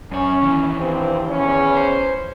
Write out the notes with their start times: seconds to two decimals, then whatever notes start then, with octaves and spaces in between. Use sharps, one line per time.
0.11 F#2 C#4 C#5
0.42 D#2 E3
0.77 G2 C4
1.29 E2 C#4
1.77 C5